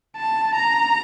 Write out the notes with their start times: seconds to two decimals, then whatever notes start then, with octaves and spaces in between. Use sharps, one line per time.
0.17 A5
0.55 A#5